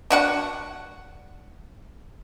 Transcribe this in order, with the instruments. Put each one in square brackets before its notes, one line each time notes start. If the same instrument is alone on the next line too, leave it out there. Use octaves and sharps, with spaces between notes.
[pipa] D4 F#4 F#5